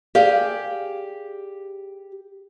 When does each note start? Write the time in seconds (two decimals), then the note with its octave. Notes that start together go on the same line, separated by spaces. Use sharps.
0.15 G4 G#4 D5 F5